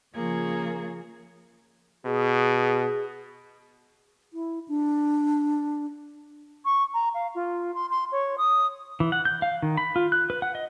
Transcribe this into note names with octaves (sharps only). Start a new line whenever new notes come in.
C#3 F3 A#3 F4 G#4 C#5
B2 G#4
E4
D4
C#6
A#5
F5
F4
C6
C6
C#5
D#6
E3
F#5
G6
F5
D#3
B5
F4
F#6
B4
F#5
D#5